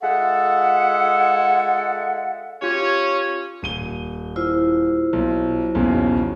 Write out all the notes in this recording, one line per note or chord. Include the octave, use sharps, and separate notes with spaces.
G#3 F4 A4 E5 F#5
C#4 F4 G4 C#5
D#1 D#7 G7
E4 F4 C5
B1
B1 E2 C#3